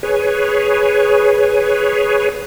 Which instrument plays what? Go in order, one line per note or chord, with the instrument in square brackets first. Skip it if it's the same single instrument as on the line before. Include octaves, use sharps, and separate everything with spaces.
[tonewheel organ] G#4 B4 C#5